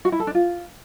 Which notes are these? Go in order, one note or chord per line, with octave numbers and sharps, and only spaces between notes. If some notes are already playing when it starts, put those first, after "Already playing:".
F#4
E4
A4
D4
F4